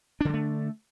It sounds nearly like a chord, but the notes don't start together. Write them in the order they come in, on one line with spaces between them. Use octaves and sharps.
D4 D3 F#3 A3